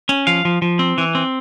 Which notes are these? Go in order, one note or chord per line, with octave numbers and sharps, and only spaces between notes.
C#4
F3 F5
F3
F3
C4
E3
C4